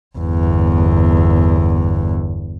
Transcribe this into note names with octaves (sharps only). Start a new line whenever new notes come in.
G1 E2